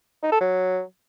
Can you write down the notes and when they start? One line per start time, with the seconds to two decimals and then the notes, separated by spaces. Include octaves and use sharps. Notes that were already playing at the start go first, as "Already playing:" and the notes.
0.23 D#4
0.32 A4
0.40 F#3